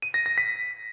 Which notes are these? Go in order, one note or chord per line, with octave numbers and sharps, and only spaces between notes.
D#7
A#6
A#6
B6